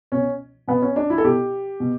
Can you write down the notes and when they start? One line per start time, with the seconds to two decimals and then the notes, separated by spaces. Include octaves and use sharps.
0.12 B2 C#4
0.68 B2 B3
0.82 C#4
0.96 D4
1.10 E4
1.18 A4
1.24 B2 G4
1.80 B2